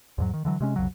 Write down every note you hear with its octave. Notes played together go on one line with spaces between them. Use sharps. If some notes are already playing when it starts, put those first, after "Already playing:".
E2 G#2 F#3
D#3
D3 E3 F#3
C3 G#3 C#4
B1 F2 C#3 F#3